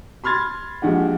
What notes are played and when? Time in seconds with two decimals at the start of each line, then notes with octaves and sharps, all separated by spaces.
0.24 B5 C6 F6 G#6 A6
0.82 A#1 G#3 D4 G4 F#5